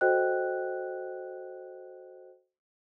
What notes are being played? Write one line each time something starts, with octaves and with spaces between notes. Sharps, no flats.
F#4 A4 C5 D#5 G5 F#6